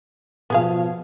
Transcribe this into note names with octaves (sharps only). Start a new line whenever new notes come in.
B2 F3 B3 G#4 F5